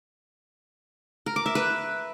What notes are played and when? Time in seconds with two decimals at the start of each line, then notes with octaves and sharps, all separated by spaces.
1.26 A#4
1.36 D6
1.46 E5
1.55 B4